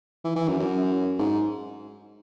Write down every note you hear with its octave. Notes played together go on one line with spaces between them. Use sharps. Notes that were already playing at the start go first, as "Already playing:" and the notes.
E3
E3
F#2
F#2
G#2